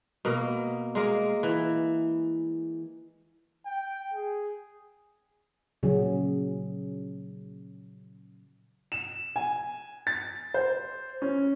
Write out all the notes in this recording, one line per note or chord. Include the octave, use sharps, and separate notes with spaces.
B2 A#3
G#3 A#3
E3
G5
G#4
A#2 C#3 F#3 C#4 G#4
E7
G#5
A6
C5
C#4